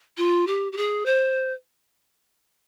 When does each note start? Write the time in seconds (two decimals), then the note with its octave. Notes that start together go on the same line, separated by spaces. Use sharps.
0.17 F4
0.47 G4
0.72 G4
0.77 G#4
1.06 C5